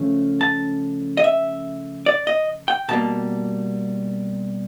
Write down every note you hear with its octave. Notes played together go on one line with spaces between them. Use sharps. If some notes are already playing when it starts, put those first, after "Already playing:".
Already playing: C#3 F3 A3 C#4
A5
D#5
E5
D5
D#5
G5
B2 G3 A#3 A5